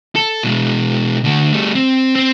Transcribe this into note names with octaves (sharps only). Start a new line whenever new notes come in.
A4
B2 G#3
D3 A3
G3 A3
C4
C4